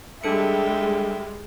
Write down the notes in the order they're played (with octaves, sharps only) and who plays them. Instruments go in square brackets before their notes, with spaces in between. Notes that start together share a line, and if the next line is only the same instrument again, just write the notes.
[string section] G3 G#3 [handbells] D4 A4 C#7 [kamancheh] E5 G5